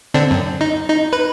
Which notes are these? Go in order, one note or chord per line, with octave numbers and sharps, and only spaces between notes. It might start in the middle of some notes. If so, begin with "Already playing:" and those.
D3 C4 D4
F#2
D#4
D#4
B4